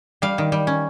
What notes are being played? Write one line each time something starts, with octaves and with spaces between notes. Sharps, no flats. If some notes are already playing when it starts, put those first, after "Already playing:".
G3 F5
D#3
G3
C#4